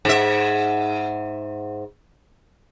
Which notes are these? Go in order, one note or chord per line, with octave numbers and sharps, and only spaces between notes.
G#2 E5